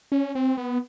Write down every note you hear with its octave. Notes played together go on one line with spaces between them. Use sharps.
C#4
C4
B3